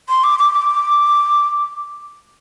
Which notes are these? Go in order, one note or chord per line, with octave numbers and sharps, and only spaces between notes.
C6
D6
D6
D6